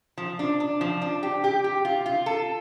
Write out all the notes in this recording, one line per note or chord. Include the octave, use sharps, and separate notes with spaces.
F3
D4
D4
F3
D4
G4
G4
G4
F4
F4
A4